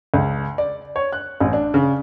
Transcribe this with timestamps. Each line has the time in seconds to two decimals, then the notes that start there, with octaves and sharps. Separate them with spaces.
0.14 C#2
0.58 D5
0.96 C#5
1.13 F#6
1.40 A1
1.53 D4
1.74 C#3